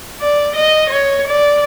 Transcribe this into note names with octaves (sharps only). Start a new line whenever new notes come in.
D5
D#5
C#5
D5